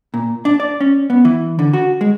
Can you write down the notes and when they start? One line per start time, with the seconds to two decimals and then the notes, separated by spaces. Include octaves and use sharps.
0.14 A#2
0.45 D4
0.60 D5
0.80 C#4
1.10 B3
1.25 E3
1.59 D3
1.73 F#4
2.01 G#3